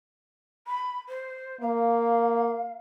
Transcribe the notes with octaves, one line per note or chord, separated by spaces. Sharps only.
B5
C5
A#3 F5